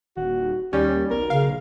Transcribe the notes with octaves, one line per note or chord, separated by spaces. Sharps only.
D#1 F#4
D#2 G3 C#4
B1 A#4
C#3 F5